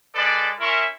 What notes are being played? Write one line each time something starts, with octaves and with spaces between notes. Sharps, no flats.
G#3 A4 B4 D5
C#4 E4 A#4 E5 C6 C#6